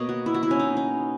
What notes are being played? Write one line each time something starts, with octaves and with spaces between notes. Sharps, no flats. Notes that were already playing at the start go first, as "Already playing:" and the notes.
Already playing: B2 A#3 C#5 D#5
F#4
E4
F#4
E4
C#4
D#4
D#4